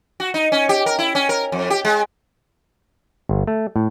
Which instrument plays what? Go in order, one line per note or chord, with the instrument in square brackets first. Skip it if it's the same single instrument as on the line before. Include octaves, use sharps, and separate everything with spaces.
[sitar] F#4
D#4
C#4
G4
A#4
E4
C#4
A#4
F2
G4
G#3
[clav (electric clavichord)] G1
A3
A2